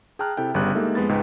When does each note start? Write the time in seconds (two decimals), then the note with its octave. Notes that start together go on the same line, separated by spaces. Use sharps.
0.19 G#4 G5 A5 A#5 F6 F#6
0.37 C3 E4 A4 G5
0.54 G1 C#3 G3 B3 F#6
0.75 G#3 A#3 D#4 G4 A4 E5
0.95 F2 G#3 B3 B5 A6
1.09 C#2 G#2 D#4 B4 G5